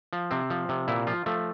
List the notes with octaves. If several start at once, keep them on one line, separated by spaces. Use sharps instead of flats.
F3
C3 C4
F3
C3
A#2 E4
F3 F4
F3 A3